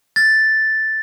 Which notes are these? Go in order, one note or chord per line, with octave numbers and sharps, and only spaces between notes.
A6